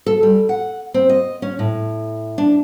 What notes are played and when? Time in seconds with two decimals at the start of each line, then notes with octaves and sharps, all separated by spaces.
0.06 A4
0.23 G3
0.49 F#5
0.94 C4
1.09 D#5
1.42 C#4
1.59 A2
2.38 D4